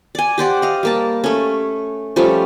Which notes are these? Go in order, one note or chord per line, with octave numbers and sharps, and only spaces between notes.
D5 G#5
G4 C5 D5 F#5
D#5 F5
G3 A#3 A5
A3 C#4
F3 G3 A3 C#4